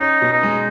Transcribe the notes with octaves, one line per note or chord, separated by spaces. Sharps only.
C#4 D#4
B2
D#4
G#3